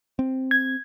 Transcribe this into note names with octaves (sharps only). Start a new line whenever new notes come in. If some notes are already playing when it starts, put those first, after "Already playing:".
C4
G#6